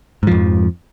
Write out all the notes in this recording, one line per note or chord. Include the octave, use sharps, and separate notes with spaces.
F2 G#2 F3